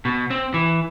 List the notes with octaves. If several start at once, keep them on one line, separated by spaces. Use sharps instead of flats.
B2
C4
E3